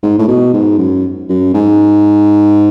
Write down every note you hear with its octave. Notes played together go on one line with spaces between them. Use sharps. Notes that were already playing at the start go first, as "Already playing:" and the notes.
G#2
A2
B2
G#2
F#2
F#2
G#2